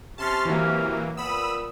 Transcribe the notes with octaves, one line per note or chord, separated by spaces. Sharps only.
C3 C#4 A5 C6 F6
E3 F#3 A#3
A#2 B3 B5 D#6 E6